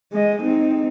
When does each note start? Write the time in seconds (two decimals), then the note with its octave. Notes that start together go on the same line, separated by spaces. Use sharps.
0.13 G#3 D#5
0.42 C4 D#4